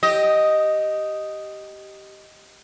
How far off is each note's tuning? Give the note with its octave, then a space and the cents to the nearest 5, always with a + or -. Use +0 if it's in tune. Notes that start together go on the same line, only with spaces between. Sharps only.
G4 -10 D#5 +0